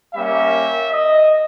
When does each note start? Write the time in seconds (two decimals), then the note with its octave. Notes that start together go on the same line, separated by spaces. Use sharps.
0.15 G3 A#3 C#4 E5
0.91 D#5